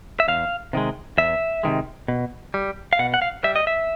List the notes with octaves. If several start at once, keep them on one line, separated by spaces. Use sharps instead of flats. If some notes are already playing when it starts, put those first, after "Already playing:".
E5
E2 F5
C3 D#3 G#3
E2 E5
C3 D#3 G#3
B2
G3
F5
B2 F#5
F#5
F5
G3 E5
D#5
E5